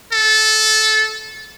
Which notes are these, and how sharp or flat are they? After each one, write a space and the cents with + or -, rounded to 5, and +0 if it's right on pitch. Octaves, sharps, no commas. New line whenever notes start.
A4 -15